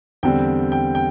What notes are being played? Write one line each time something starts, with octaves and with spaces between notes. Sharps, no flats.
E2 D3 G3 C4 G5
G5
G5